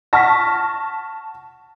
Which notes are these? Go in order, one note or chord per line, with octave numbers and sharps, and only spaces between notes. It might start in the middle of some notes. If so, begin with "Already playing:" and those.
F#5 A5 C#6 F6 A#6 B6